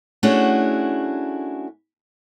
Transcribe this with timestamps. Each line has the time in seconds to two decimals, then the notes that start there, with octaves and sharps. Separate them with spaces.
0.23 A3 C#4 D4 E4 F#4 G#4